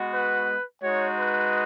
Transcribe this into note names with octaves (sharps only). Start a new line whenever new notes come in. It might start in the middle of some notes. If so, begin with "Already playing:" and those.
Already playing: G#3 B3 F#4
B4
G#3 D#4 F#4 C#5
B4